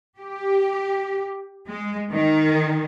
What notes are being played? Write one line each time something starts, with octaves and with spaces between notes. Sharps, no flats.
G4
G#3
D#3